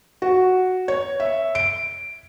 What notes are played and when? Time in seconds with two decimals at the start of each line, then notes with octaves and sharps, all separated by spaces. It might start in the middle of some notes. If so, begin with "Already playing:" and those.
0.22 F#4
0.88 C#5
1.20 E5
1.55 D7